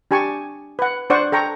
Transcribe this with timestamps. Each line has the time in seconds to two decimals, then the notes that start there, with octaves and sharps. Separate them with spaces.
0.11 D4 G4 G#5 A5 C#6
0.79 B4 F#5
1.10 D4 C5 D5 F#5 C#6
1.32 A4 G5 A#5 C#6